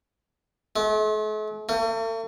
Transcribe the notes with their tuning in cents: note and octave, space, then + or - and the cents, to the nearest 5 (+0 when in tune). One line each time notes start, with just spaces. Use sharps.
A3 -45
A3 +45